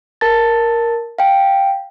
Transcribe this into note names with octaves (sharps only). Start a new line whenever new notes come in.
A#4 A5 A6
F5 G5